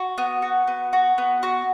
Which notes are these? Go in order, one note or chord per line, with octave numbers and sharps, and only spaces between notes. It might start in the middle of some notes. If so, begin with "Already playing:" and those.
Already playing: F#4
B3
F#4
B3
F#4
B3
F#4